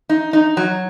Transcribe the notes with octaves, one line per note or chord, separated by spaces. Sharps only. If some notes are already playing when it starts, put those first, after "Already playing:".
D#4
D#4
F#3